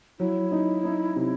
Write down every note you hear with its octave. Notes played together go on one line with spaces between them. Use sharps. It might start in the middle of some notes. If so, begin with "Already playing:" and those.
F#3 E4
D#4
D#4
C3